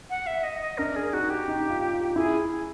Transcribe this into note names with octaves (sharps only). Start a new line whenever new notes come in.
F#5
E5
D#5
D#5
D4 A#4
G#4
D#4 F#4
G4
D#4
F4
F4
E4 G#4